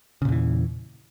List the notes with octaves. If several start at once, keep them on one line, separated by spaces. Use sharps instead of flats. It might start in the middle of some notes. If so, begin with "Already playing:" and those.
E2 A#2 C#3 E3